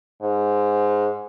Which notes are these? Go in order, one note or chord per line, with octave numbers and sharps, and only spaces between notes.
G#2